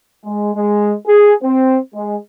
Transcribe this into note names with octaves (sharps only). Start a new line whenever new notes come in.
G#3
G#3
G#4
C4
G#3